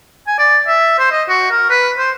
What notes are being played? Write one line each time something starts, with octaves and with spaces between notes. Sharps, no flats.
G#5
D5
E5
C5
D#5
F#4
A#4
B4
C5